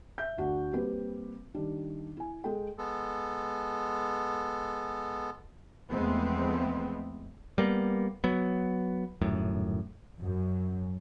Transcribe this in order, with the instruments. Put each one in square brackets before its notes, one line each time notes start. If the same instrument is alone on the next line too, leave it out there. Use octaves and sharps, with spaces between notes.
[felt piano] E5 G6
D2 D4 F#4 F#5
G3 A#3 C4 B4
D#3 G3 D4
E4 G#5
G#3 A4 G5
[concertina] G#3 B3 A4
[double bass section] E2 F3 G#3 A3 B3 C4
[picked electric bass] G3 A#3 B3
F#3 B3
D#1 F#2 A2
[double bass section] F#2